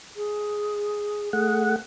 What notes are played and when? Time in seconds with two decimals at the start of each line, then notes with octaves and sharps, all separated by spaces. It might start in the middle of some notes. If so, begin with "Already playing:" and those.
0.16 G#4
1.33 A3 G#4 F#5